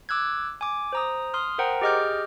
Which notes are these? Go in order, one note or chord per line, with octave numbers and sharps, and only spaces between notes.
D6 E6 F#6 G#6
G#5 D6
C5 A#5 D#6
C6 D#6 F6
A#4 C5 F#5 G5 A#5
G4 G#4 D#5 D6 F6 G6